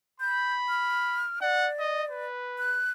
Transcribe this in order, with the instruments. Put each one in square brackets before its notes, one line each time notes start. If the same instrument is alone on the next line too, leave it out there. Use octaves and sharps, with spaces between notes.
[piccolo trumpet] B5 [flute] G6
[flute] F6
[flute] D5 [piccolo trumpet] F#5
[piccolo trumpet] D#5
B4
[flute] F#6